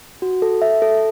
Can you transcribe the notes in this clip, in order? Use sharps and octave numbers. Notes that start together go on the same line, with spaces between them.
F#4
A4
E5
A4